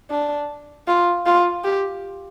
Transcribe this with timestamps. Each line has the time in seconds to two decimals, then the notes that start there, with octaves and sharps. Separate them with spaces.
0.10 D4
0.87 F4
1.26 F4
1.64 G4